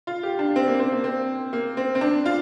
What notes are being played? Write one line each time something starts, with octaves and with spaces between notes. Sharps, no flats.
F4
G4
D4
C4
A#3
C4
A#3
C4
A#3
C4
C4
D4
F4